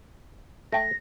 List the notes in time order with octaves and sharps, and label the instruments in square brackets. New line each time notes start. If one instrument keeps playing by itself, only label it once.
[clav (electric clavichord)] A3 G5 [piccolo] A#6